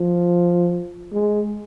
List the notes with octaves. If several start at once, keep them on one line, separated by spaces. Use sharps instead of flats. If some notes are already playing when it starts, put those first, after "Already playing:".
Already playing: F3
G#3